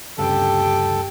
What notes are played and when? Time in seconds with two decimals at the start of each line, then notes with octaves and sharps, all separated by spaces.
0.18 D2 G2 C#3 G4 A4 G5